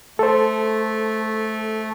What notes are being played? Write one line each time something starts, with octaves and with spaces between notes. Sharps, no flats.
A3 A4 C5